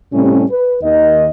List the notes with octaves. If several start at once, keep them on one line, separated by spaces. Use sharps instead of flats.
A2 C3 G3 C4 C#4
B4
D#2 D#3 D#5